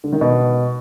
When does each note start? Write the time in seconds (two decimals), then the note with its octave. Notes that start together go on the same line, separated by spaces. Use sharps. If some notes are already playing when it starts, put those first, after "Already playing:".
0.04 D3
0.12 D#3
0.21 B2